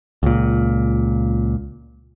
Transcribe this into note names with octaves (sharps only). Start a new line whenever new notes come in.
C#2 A#2